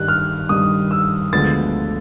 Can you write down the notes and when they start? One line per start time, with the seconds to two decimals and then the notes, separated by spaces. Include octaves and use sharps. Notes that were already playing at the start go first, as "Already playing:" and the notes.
Already playing: G2 D#3 G3 F#6
0.08 F6
0.49 G2 D#3 G3 D#6
0.91 E6
1.33 D2 D3 F3 G#3 B3 A6